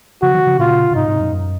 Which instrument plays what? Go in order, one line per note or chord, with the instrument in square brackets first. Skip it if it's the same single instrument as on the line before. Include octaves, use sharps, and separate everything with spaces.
[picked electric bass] C#3 F3 [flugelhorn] F#4
[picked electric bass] D#3 F#3
C#3 F3
[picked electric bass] A#2 C#3 [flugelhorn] F4
[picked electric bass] C#3
[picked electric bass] G#2 C3 [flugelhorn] D#4
[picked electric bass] G#2 C3
F#2 A#2
F#2